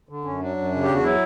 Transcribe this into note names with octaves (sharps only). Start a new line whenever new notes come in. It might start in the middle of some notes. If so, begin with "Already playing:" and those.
D3
F#2 C#4
F#3 D4
F#2
C#3
G4
E2
F#4
F#3 E4